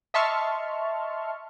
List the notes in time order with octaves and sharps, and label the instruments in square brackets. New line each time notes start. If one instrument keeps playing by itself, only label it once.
[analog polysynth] D#5 E5 A5 C6 C#6 F6